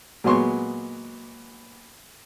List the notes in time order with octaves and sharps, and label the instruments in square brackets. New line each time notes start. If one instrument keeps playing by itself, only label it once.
[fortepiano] A#2 F#3 G#3 B3 C6 C#6